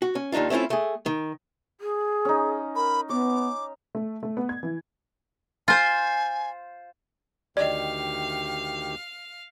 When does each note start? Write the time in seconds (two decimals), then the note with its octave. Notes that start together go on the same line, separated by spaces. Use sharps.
0.02 F#4
0.15 C#4
0.32 D#2 D#3 D4 D#4 F4
0.50 A3 C4 C#4 E4 F4
0.70 A3 G#4
1.06 D#3
1.81 G#4
2.25 C#4 D#4
2.75 A#4 B5
3.09 B3 C#5 D6
3.95 A3
4.23 A3
4.37 B3
4.49 G#6
4.63 E3
5.68 F4 C5 G#5
7.57 D2 D#3 G4 D5 D#5 F5